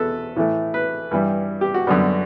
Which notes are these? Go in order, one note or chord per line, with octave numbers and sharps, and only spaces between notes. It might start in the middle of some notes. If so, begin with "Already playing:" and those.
Already playing: E2 B2 A4 B4
A2 E3 A3
B4
G2 E3 G3
G4
F#4
F#2 D3 G3 B3